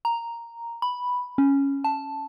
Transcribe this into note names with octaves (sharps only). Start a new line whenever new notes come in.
A#5
B5
C#4
A5